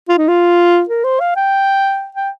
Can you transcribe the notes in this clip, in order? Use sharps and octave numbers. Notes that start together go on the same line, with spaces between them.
F4
D#4
F4
A#4
C5
F5
G5
G5